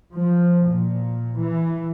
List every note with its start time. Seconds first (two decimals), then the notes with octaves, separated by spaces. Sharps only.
0.13 F3
0.68 A#2
1.41 E3